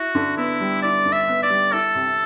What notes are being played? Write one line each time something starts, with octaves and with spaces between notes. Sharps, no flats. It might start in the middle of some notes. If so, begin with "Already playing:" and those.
Already playing: E4 F#4
D3
B3 E4
G3
E4 D5
D3
E5
B3
D5
G3
E4 A4
C3